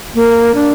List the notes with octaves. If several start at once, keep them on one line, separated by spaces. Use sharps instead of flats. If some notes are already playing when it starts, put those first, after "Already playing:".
A#3
D4